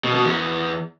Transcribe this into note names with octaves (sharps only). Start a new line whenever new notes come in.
B2
B2
E2